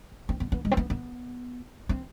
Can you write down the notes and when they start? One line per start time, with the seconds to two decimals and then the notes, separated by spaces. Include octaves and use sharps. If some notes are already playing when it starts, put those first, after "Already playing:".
0.29 C4
0.40 B3
0.52 B3
0.65 G#3
0.71 C4
0.77 B3
0.90 B3
1.89 C4